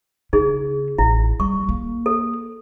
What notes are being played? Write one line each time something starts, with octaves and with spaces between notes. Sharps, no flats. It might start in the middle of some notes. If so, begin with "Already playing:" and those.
C#3 D#4 G#4
A1 E4
G3 C#6
A#3
A4